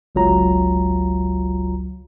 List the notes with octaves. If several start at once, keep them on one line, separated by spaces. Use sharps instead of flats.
G1 C#2 F#3 F4 A#5